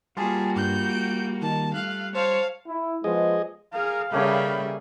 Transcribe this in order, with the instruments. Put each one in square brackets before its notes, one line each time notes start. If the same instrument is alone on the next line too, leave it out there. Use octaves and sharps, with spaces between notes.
[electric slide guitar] G3 F4 [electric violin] A#3 F#4 [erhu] G#4 [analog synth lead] A5
[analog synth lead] G2 [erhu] G6
[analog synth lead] D7
[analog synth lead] D#3 [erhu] A5
[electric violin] A3 [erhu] F5 [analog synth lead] F#6
[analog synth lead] C5 [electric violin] C#5 A5 [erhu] F5
[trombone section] E4
[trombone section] F3 G#3 B3 [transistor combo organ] G#4 D#5
[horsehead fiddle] G#4 A#4 [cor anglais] F5
[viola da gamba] C#3 G3 G#4 [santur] A3 A#3 C#4 [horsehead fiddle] G5 B5